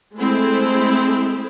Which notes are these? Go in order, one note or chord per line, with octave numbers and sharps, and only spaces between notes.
G#3 A3 C4 E4 A4